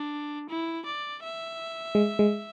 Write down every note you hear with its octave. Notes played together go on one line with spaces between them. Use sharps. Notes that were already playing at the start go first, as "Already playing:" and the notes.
Already playing: D4
E4
D5
E5
G#3
G#3